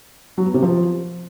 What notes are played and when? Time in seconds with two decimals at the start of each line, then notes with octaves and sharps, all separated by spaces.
0.38 F#3
0.46 B3
0.54 C3
0.63 F3